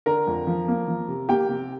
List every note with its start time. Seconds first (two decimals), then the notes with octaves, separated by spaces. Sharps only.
0.06 D3 A#4 A#5
0.27 F2
0.47 F3
0.68 A#3
0.88 F3
1.08 C3
1.29 A#3 G4 G5
1.49 C3